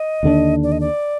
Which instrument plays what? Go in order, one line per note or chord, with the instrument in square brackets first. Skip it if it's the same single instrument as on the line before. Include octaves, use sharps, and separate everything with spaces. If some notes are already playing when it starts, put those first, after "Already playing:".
Already playing: [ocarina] D#5
[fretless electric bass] D#2 D3 A3 D4
[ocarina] D5
D#5
D5